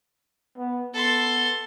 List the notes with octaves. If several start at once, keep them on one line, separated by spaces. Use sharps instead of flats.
B3
B3 A4 C6